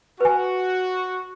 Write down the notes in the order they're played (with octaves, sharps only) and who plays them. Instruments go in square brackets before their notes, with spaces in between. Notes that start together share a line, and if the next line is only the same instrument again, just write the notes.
[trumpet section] F#4 [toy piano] B4 G#5